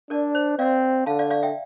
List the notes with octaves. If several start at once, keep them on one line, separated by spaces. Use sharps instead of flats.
D4 A#4 D5
C5
C4 D5 F5
D3 F5 A5
D5 F5
D5 F5
E5 G5